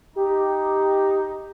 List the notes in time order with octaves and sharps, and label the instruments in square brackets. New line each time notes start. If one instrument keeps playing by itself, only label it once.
[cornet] D#4 [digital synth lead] G4